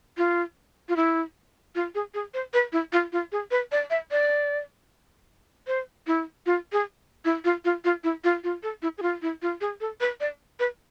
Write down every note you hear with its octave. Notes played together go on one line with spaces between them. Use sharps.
F4
F4
E4
F4
G#4
G#4
C5
B4
E4
F4
F4
G#4
B4
D5
E5
D5
C5
E4
F4
G#4
E4
F4
F4
F4
E4
F4
F4
A4
E4
G#4
F4
E4
F4
G#4
A4
B4
D5
B4